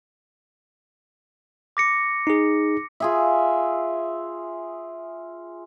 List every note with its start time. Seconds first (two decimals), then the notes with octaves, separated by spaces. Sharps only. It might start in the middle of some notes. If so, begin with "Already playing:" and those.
1.77 D6 A#6 C#7
2.27 D#4 G#4
3.00 F4 G#4 E5